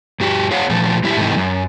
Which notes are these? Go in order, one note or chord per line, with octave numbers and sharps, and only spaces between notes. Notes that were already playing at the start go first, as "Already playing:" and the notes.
G2 F#4 G4
G#4 C#5 F5 F#5
A#2 F3 A3
A2 F#3 E4 G4 E5
G#2 C3 E3 A3 D#4
F#2